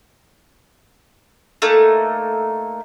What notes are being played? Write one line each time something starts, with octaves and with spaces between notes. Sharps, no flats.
A3 A#3 D#4